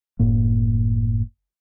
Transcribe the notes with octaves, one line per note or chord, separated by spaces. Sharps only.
F#1 A2 A#3